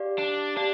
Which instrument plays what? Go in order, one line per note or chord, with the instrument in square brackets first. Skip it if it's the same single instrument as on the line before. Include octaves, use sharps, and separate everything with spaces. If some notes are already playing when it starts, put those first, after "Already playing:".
Already playing: [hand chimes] G4 D5 F5
[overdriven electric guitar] D4
[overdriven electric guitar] D4 [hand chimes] G4 D5 F5